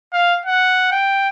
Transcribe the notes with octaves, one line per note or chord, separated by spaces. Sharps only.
F5
F#5
G5